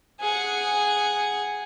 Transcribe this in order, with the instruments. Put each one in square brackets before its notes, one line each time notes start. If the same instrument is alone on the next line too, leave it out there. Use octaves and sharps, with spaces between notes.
[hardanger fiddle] G#4 F#5